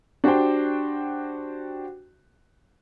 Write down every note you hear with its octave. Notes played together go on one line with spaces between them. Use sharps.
D4 F#4 G4 C5 G5